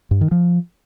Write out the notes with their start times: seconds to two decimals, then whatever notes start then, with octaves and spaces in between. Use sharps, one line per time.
0.11 G2
0.21 D#3
0.31 F3